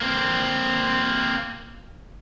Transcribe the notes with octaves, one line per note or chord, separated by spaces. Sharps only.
A#3 C4